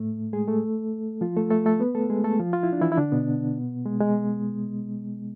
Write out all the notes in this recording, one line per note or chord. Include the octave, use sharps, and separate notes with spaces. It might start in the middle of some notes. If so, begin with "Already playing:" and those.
Already playing: A2 A3
G#3 G#4
A3 A4
F3 F4
A3 A4
A3 A4
A3 A4
B3 B4
A3 A4
G#3 G#4
A3 A4
F3 F4
F4
E4
D4
E3 E4
E4
D3 D4
B2 B3
G#3
G#3